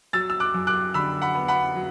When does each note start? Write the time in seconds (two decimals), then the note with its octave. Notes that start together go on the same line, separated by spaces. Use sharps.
0.13 F#3 E6 A6
0.30 E6
0.40 D6 F#6
0.54 F#2
0.67 D6 F#6
0.94 D3 B5 E6
1.22 F#5 B5
1.35 B3
1.48 F#5 B5
1.76 F#3